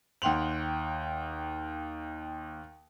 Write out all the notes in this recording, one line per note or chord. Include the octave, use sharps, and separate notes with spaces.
D#2 F#5 G5 C6 F7 F#7